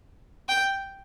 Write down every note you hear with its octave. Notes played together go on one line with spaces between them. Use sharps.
G5